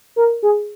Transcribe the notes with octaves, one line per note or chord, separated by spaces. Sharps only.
A#4
G#4